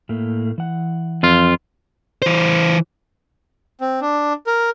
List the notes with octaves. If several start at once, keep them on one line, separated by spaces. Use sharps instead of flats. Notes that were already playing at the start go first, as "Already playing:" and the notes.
A2 A3 A#3
E3 F#5
F2 F4
E3 C5
C4
D4
A#4